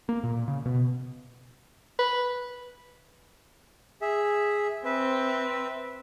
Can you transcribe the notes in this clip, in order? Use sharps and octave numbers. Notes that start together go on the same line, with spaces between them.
A#3
A#2
C#3
B2
B4
G#4 E5
C4 B4 E5